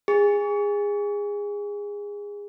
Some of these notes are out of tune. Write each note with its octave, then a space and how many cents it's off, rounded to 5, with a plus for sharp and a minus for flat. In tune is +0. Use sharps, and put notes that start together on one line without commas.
G#4 -20